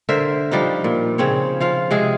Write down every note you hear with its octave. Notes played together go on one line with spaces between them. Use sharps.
D3 A#4 C5 E5
F3 G3 D4 D#4
A#2
C#3 C4 C#5
F3 F4 F5
C3 G#3 C4 G#4